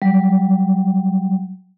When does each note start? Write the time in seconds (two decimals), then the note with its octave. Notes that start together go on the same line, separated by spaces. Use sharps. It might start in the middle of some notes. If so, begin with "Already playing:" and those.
0.02 F#3 G3